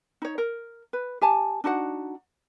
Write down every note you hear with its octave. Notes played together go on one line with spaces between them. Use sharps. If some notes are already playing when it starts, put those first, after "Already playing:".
D#4 C#5
A#4
B4
G4 G#5 A5
D4 D#4 F#4 F#5